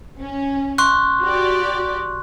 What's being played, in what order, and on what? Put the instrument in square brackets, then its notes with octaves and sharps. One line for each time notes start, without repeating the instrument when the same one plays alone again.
[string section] C#4
[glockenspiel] C6 C#6 F#6
[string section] F#4 G4 D5